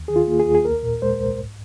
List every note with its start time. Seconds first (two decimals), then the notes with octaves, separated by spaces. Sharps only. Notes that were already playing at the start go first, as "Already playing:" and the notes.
Already playing: D#2
0.08 D#3 G#4
0.16 F4
0.27 A#3
0.40 G#4
0.46 D#2
0.55 G#4
0.65 C2 A#4
0.83 A#2
1.02 G#3 C5
1.21 C2
1.39 G#2